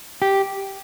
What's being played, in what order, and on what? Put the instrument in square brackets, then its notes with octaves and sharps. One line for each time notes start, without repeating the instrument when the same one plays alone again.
[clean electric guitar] G4